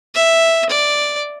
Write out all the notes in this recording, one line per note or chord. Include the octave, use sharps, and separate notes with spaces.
E5
D5